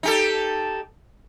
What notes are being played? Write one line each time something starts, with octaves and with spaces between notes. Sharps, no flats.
D#4 G4 A4